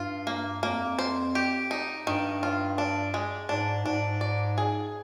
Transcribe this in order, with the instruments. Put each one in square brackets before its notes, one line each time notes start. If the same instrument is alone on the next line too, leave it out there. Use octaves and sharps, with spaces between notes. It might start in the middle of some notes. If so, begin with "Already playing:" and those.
Already playing: [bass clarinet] G2 [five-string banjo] F4
[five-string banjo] A#3
[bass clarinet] F2 [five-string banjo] A#3
[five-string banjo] C5
G4
D#4
[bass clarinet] G2 [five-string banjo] D#3
[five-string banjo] F4
D4
G#3
[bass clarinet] G#2 [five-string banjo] D4
[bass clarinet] G#2 [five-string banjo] D4
[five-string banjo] D5
G#4